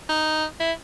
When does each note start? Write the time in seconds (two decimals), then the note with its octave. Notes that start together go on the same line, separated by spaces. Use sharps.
0.09 D#4
0.60 E4